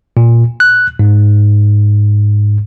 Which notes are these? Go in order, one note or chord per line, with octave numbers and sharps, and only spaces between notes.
A#2
F#6
G#2